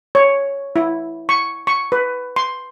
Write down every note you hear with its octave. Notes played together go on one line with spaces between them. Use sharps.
C#5
E4
C#6
C#6
B4
C6